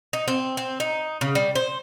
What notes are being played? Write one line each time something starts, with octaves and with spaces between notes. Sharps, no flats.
D#4
C4
C4
D#4
C#3
G3
C5